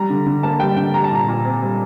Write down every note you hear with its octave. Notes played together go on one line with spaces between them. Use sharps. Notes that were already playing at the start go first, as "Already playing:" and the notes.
Already playing: G3 A#5
D3
D3
A#3 A5
G3 G5
D3 G5
G3 A#5
A5
A#2 A#5
A#2
C4
G3